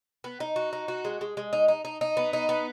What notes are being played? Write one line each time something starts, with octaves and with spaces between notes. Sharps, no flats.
B3
D#4
F#4
D#4
F#4
G#3
G#3
G#3
D#4
D#4
D#4
D#4
B3
D#4
B3